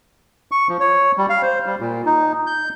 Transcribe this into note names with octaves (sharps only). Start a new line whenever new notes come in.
C#6
F3
C#5
G3
F5
C5
G3
A#2
D#4
G6